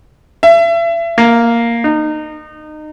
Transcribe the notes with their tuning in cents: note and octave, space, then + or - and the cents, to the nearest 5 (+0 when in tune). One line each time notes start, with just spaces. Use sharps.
E5 +35
A#3 +0
D#4 -25